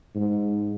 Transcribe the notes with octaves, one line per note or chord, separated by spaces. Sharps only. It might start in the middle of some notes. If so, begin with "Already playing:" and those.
G#2